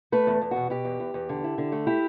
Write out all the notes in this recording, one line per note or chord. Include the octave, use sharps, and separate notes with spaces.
A3 B4
E2
E2
B2 F#4
B2 G4
E2
E2
E2
D3
E4
D3
A3
E4 G4